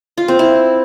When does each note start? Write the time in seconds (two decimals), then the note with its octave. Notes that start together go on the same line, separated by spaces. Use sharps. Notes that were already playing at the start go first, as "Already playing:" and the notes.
0.18 F4
0.28 C4
0.39 E4